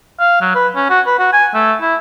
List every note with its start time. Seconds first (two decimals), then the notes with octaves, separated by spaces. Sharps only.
0.20 F5
0.41 F#3
0.55 B4
0.76 C#4
0.90 F#4
1.06 B4
1.19 F#4
1.33 G#5
1.54 A3
1.81 E4